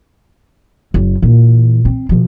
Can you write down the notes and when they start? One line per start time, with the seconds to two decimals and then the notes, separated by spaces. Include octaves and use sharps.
0.94 F#1
1.22 A#2 E3
1.85 C4
2.09 B2 F3